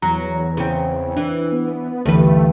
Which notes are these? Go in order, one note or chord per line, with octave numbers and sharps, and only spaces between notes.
E2 F#3 A#5
C#3 C4
E3 D4
B3
D2 G2 D3 E3 A3 B4